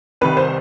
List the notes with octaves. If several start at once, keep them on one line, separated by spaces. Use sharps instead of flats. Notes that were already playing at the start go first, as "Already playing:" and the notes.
C2 C3 D#3 B4
C5